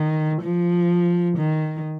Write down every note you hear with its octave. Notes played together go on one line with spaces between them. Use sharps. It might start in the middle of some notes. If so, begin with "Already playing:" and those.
Already playing: D#3
F3
D#3